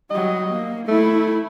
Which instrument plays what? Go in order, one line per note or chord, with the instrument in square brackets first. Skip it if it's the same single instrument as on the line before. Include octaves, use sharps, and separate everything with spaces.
[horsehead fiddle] F#3 G3 [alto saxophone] D#5
[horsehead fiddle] A#3
[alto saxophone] A3 [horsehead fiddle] E4